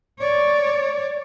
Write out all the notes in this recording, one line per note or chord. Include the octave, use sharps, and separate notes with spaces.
C#5 D5